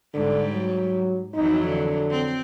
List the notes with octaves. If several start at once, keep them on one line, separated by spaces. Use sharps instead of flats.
G#2 D3 G3
F#3
F2 E3 F#3 D#4
D3
C4